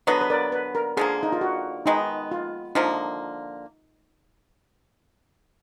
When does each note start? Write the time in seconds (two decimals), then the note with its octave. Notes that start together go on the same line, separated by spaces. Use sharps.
0.07 D3 F#3 B3 B4 D#5
0.21 B4
0.30 A#4 D5
0.52 B4
0.75 A#4
0.97 D3 F3 A#3 G#4
1.23 D#4
1.32 F4
1.41 F#4
1.86 D#3 G#3 B3 D#4
2.31 F4
2.75 D3 F3 A#3 D#4